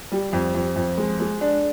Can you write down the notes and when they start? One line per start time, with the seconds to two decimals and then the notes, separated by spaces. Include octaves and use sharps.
0.12 G3
0.33 F2
0.55 F2
0.76 F2
0.98 G#3
1.20 G#3
1.41 D4